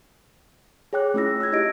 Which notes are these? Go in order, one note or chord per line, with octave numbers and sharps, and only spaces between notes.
G#4 C#5 G5 D6 F#6
A3 C#4 E4 F4 E6 A#6
E6 F#6 G#6 A#6
D#4 E4 G4 D#5 A#6 D7